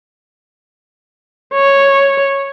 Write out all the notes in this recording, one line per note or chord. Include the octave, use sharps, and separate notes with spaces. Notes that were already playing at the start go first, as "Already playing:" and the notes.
C#5